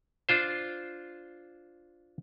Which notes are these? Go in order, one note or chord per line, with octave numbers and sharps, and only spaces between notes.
D4 F4 C5